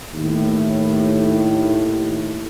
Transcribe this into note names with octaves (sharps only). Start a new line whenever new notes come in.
D#2 A2